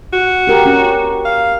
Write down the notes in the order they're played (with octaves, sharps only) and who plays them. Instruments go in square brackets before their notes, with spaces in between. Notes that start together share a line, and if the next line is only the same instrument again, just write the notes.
[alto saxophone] F#4
[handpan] G4 A#4
C#4
[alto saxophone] F5